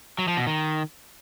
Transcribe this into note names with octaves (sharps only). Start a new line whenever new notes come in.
F#3
F3
B2
D#3